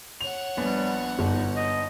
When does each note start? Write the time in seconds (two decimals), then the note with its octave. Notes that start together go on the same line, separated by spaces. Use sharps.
0.21 C#5 F#5 F7
0.57 A#1 G3 B3 D4
1.19 G1 D#4
1.55 D#5